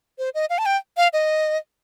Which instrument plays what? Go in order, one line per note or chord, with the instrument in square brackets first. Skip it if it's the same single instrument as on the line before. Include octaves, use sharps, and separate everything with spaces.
[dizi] C5
D#5
F5
A5
G5
F5
D#5